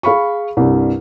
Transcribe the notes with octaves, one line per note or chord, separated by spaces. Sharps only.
G#4 F5 B5 C#6
C2 G2